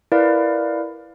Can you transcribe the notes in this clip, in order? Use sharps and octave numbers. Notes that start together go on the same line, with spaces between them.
E4 A#4 B4 D5 F5